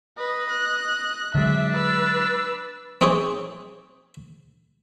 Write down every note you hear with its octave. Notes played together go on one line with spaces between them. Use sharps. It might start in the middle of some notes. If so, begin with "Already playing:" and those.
B4 D#5
F#6
D3 F#3 G#3 D4 E5
B4 E6
C4 D#4 G4 G#4 C#5